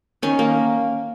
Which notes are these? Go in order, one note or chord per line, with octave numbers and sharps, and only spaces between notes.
D#3 C#4
A#3